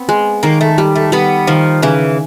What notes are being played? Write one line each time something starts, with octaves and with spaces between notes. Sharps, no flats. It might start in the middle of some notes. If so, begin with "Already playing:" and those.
Already playing: B3 C4
G#3
D#3 A#3
A3
G3
A3
G3 B3
D#3 F3
C#3 E3